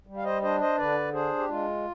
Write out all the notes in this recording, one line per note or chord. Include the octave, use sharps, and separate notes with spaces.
G3
F5
C5 D#5
D4 C5 D#5
C5 D#5
D3 B4 D5
D4 G#4 C5
G4
G#3 F4